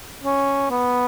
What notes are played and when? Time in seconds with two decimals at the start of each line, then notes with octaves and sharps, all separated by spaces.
0.24 C#4
0.70 B3